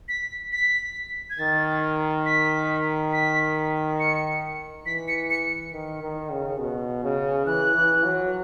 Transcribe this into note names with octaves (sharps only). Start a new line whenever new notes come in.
B6
B6
G#6
D#3 A6
B6
B6
C#7
E3 B6
C#7
C#7
D#3
D#3
C#3
B2
C#3
E3 F#6
E3
F#3